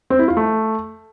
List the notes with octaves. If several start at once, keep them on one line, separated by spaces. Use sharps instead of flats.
C4
E4
F4
A3